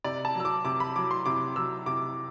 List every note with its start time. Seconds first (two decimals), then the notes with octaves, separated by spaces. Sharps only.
0.04 C3 D5
0.25 A5
0.35 F#3 E6
0.45 D6
0.65 C3 D6
0.80 B5
0.96 F#3 D6
1.11 C6
1.26 C3 D6
1.56 F#3 E6
1.86 C3 D6